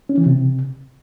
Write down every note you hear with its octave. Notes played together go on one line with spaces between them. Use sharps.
C#4
E3
C3